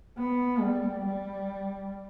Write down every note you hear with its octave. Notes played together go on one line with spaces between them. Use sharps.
B3
G3
G3